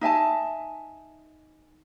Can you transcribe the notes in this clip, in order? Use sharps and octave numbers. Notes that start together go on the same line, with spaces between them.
D#4 E5 G#5 A5